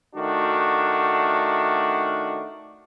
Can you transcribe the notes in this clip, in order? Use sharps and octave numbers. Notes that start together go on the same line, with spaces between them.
D#3 A3 D4 F#4